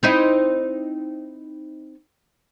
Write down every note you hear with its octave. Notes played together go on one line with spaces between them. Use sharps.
C4 D#4 E4